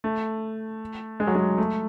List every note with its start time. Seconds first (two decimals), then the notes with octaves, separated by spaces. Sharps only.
0.04 A3
1.20 G#3
1.27 F#3
1.35 G#3
1.58 A3